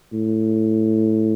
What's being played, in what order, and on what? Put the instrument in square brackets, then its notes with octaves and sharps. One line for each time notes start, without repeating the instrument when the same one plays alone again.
[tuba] A2